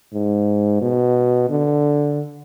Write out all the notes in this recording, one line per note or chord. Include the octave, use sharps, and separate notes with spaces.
G#2
B2
D3